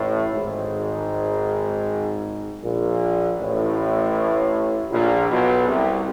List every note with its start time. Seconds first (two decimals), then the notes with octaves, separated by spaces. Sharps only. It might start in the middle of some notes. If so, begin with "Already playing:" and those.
Already playing: A1 A2
0.33 G#1 G#2
2.62 A#1 A#2
3.38 A1 A2
4.91 A#1 A#2
5.29 B1 B2
5.67 C2 C3